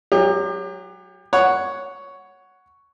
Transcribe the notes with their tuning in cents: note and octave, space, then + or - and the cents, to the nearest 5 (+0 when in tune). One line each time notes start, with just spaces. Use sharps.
F#3 +0 G4 +35
C#5 +5 F#5 +0